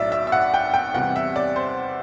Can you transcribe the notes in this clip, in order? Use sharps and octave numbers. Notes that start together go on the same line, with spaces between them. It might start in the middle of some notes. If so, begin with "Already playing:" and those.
Already playing: B1 A2 F#3 D5 E5
E5
E5
F#5
G5
G5
E2 C3 G3 F#5
E5
D5
C5